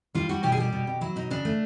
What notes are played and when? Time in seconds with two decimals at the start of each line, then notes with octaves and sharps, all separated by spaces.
0.15 G3 F4
0.29 G3 F#4
0.43 B2 G4
0.52 G#4
0.57 G3 G4
0.73 B2
0.87 B2
1.01 F#3 E4
1.16 B2 D#4
1.30 C#3 D4
1.45 A3